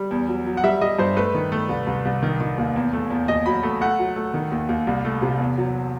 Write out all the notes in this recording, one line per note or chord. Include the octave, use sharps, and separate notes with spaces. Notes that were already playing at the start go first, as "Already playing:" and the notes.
Already playing: G3
E2
F#3
F#3
F#5
G3 E5
G3 D#5
G2 C5
A3 B4
D#3
A3
C2
C2
C2
D#3
D#3
D#2
E2
A3
E2
D#2 D#5
F#3 B5
A3
A3 F#5
F#3
A3
D#3
D#2
D#2
C2
A3
C3
E2
F#3